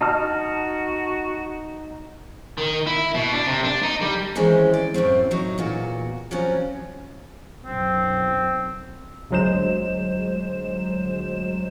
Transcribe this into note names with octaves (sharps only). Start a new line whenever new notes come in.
D#4 F#4 A5 F6
D#3
E4
B2
D4
C3
D4
D#4
G3
D#3 E3 G#3 C4 C#4 C5
D5
F#2 A2 A3 C4
A2 F#3 D#4
E2 A#2 F#4
F3 F#3 C4 C#4 F4
B1 F#2 C4
G1 D2 F#3 G#3 C5 E7